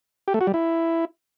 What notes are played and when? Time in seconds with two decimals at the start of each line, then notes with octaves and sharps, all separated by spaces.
0.28 G4
0.34 A3
0.41 F#4
0.47 G3
0.54 E4